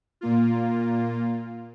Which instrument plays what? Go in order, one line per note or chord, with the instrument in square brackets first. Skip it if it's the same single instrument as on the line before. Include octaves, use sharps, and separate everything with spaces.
[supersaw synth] A#2 A#3 F4